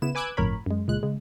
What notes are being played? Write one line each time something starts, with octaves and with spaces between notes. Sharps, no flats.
C#3 B3 E4 E7
B4 G#5 D6 E6 F#6 G#6
G1 F2 A2 A#4 C#5 B5
F#2 G#3
C#2 A#2 G#3 F#6
C#3 G#3